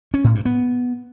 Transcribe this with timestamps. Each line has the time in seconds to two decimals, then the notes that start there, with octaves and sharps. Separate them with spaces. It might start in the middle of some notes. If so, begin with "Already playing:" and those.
0.14 C#4
0.24 A2
0.35 G2
0.45 B3